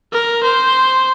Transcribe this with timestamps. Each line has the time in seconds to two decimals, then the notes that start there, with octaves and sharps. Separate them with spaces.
0.12 A#4
0.43 C5